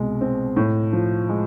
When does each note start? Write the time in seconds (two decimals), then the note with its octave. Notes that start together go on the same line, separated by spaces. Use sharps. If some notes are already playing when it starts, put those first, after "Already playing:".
Already playing: C2 B2 G#3
0.21 C4
0.56 A2
0.93 F3
1.29 G#3